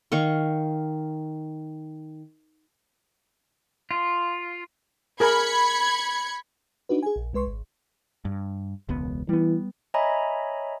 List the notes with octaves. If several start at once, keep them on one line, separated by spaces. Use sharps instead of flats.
D#3 F5 C#6
F4
G#4 A#4 B5 G#6 C#7
D4 D#4 F#4 B4
G#4 G#5
A#1
C2 G#3 B4 C6 C#6
G#1
G2
E1 C#2 B3
E3 G3 B3
C#5 D#5 E5 G#5 A#5 B5